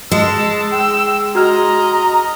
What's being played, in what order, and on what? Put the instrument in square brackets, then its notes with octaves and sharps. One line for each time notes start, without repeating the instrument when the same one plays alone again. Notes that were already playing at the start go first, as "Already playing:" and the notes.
[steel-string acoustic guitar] G#3 [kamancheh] A5 E6
[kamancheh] G5 E6
[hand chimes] F#4 F6 [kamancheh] D#5 A#5